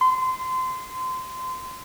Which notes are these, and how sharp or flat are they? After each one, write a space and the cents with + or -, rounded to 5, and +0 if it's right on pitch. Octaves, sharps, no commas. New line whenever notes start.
C6 -30